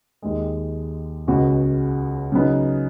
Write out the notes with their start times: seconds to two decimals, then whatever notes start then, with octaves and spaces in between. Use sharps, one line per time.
0.22 D#2 D#3 G#3
1.27 C#2 C#3 G#3 B3 F#4
2.32 C#3 F#3 B3 D#4